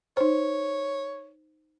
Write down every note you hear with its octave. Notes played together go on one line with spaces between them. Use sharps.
D#4 C5 C#5